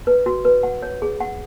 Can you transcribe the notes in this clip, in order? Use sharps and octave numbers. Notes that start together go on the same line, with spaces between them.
B4
F#4
B4
F#5
C#5
G#4
F#5